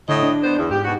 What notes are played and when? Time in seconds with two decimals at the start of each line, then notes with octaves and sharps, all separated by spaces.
0.09 A2 D3 D#5
0.23 D4
0.42 B3 C5
0.57 E2
0.70 G#2 G4
0.84 B2 F#4